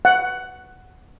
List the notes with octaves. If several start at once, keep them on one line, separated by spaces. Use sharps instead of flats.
F#5